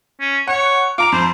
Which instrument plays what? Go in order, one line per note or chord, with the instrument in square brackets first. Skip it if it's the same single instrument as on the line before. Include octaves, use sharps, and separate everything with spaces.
[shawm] C#4
[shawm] C#5 [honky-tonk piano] F#5
[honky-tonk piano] F4 A#5 F7 [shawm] D6
[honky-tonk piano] F2 A#5 [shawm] C5